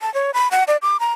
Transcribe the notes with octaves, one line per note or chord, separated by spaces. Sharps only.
A5
C#5
B5
F#5
D5
D6
A#5